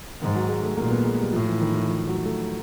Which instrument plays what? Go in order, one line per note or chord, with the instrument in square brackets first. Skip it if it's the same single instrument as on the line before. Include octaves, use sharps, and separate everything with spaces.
[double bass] G#2 [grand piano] D#3
[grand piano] F#3
G#3
A3
[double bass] A#2 [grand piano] A#3
[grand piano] B3
G#3
G3
[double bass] A2 [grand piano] F3
[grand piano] E3
D#3
E3
F3
F#3
A3